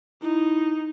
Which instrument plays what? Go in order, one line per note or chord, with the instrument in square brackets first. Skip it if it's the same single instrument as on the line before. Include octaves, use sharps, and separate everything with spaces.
[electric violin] D#4 [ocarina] E4